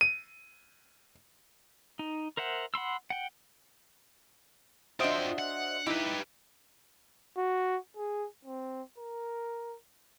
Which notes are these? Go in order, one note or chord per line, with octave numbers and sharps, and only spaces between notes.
D#7
D#4
A#4 C5 E5 F#5
F#5 B5 C6 E6
F#5 G5
D4 F4 F#4 C5 D#5 E5 G5
F#5
D#4 E4 G4 B4
F#4
G#4
C4
A#4